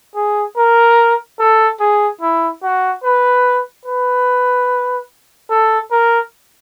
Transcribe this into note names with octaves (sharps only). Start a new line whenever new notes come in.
G#4
A#4
A4
G#4
E4
F#4
B4
B4
A4
A#4